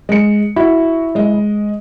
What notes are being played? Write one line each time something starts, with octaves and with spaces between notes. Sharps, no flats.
G#3 C#7
E4 F#4
G#3 D#5